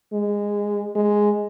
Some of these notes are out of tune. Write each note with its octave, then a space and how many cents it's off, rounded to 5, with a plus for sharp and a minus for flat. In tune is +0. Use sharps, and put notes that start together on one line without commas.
G#3 -15
G#3 +0